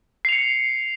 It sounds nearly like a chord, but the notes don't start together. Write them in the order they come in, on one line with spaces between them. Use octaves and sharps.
C7 F7 C#7